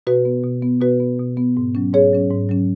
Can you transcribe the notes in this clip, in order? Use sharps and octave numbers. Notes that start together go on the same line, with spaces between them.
B2 F#4 B4
B3
B2
B3
B2 F#4 B4
B3
B2
B3
G#2
F#3 C#4
G#2 G#4 C#5
F#3 C#4
G#2
F#3 C#4